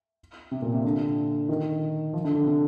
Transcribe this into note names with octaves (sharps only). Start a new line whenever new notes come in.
C3
A#2
C3
D3
D#3
F3
D3
D3
C3